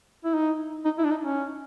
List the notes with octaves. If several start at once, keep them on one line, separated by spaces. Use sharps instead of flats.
E4
D#4
D#4
E4
D4
D#4
C#4